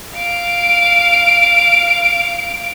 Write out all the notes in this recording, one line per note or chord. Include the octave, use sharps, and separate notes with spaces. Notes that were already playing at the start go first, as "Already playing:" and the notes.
F5 D7